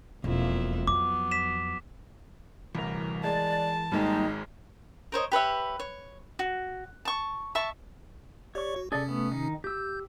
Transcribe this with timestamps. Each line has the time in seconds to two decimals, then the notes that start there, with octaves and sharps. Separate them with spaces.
0.24 E1 F2 A#3 E4
0.87 F2 F#3 B3 D6
1.31 B6 E7
2.75 D1 C2 E3 A#4
3.24 G#3 D5 A5
3.92 G#1 G#2 G3 G#3 A#3 D#4 G4
5.12 A#4 C5 C#5 D#5
5.32 G4 B4 C#5 E5
5.79 C#5
6.39 F#4
7.05 A5 C#6
7.55 E5 A5 C#6
8.55 G4 C#5 D5 C#6
8.76 F#4
8.92 C3 C#4 G#4 A4 D5
9.08 A3 B3
9.32 D#3 D#4
9.64 G4 E6 G6